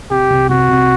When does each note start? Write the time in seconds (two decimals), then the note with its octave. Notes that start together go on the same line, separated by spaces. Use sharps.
0.10 C3 G4
0.30 C2
0.49 C2 F#4
0.69 C3